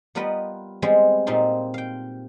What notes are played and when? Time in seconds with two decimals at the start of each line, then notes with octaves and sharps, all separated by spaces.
0.15 G3 B3 F4 A#4 B4 D#5
0.82 G3 G#3 B3 C4
1.27 A#2 G3 C4 D#4 F4 C6
1.74 F5 G5